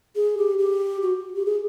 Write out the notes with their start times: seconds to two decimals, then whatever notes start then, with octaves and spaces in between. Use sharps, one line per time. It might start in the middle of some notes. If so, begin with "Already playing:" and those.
0.16 G#4
0.37 G4
0.58 G4
1.02 F#4
1.36 G4
1.45 G#4